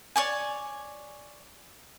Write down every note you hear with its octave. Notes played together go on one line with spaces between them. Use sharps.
C#5 D5 G#5